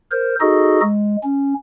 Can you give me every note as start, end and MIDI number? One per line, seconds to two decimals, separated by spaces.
0.11 0.35 70
0.11 0.35 72
0.40 0.80 63
0.40 0.80 66
0.40 0.80 68
0.40 0.80 69
0.40 0.80 75
0.81 1.16 56
1.23 1.54 61